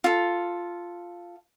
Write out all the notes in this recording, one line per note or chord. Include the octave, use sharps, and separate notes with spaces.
F4 A4